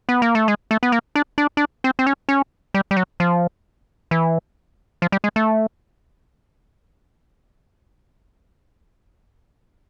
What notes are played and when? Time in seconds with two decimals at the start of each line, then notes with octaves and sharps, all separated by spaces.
0.09 B3
0.22 A#3
0.35 A3
0.48 G#3
0.71 A3
0.83 B3
0.92 A#3
1.15 D4
1.38 D4
1.57 D4
1.84 C4
1.99 C4
2.07 C#4
2.29 C#4
2.74 G3
2.91 G3
2.97 F#3
3.20 F3
4.11 E3
5.02 F3
5.12 G3
5.24 G#3
5.36 A3